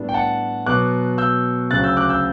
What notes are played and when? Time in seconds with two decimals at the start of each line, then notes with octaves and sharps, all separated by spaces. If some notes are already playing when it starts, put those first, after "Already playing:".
Already playing: A2 G3 B3 D4
0.09 G5
0.14 F#5 A5
0.66 B2 F#3 B3 D6 F#6
1.18 E6 G6
1.71 D2 C#3 F#3 F#6 A6
1.84 E6 G6
1.97 D6 F#6
2.09 E6 G6